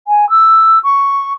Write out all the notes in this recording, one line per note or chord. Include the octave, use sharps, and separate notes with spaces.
G#5
E6
C#6